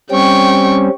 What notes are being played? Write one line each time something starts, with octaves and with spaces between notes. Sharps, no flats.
G3 C4 C#4 G5 C#6